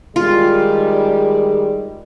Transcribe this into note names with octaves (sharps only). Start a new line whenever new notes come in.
D#3 G3 G#3 F4